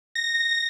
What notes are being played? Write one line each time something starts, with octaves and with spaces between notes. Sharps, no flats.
A#6